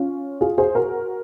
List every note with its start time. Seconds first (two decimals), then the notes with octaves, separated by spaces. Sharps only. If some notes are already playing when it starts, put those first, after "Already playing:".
Already playing: C#4 F4
0.41 F4 G#4
0.58 G#4 C5
0.75 F#4 A#4